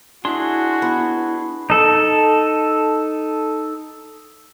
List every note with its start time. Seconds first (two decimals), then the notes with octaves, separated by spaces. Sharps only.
0.25 D4 E4 F#4 G#4 C6
0.82 B3
1.70 D#4 A4